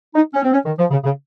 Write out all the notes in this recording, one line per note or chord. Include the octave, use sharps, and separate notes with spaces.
D#4
C#4
C4
C#4
D#3
F3
C#3
C#3